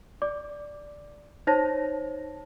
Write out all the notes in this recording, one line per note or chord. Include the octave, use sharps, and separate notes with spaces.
D5 D6
D#4 C5 C#5 A5 A#6